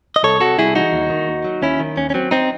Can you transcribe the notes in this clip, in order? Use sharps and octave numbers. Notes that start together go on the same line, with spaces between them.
D#5
C2 A4 C#5
C3 F#4 A4
C2 E4 G#4
E3 D#4 F#4
D#2
D#3
D#2
F#3
D#2 C#4 E4
D#3
D#2 C#4
C#4
F#3 C4
C4 D#4